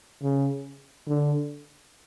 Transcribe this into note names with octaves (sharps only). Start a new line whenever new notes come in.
C#3
D3